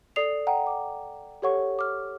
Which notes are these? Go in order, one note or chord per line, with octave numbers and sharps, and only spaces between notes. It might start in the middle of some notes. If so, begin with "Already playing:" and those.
A4 D5 D#6 C7 F7
F#5 G5 A#5
D6
G4 A4 C#5 F#5 C#6
D6 F6